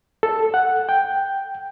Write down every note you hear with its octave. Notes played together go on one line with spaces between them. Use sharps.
A4
F#5
G5